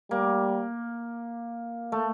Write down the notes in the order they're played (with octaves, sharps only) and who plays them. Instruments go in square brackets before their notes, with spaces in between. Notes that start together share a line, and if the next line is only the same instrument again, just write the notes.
[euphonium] G3 [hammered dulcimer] A#3
[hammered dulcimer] A3